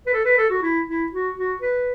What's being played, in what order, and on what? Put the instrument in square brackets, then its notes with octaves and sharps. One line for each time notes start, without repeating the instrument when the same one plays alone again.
[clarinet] B4
A4
B4
A4
F#4
E4
E4
F#4
F#4
B4